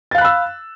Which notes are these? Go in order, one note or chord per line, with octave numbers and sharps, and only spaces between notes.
F5 B5 E6 F#6 A6